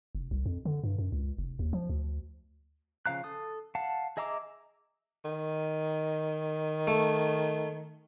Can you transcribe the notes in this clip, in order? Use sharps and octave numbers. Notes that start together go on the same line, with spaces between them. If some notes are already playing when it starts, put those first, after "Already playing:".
F1
C2
F2
D3
G2
F#2
C#2
F1
D#2
F3
D2
C#3 F3 F5 A#5 F#6
A4 D#6
F5 F#5 A5
G#4 D#5 E5 A#5 D6
D#3
A3